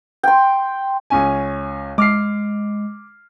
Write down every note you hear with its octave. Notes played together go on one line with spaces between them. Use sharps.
G5 C6
C#2 C#4 G#5
G#3 D6 F6 C7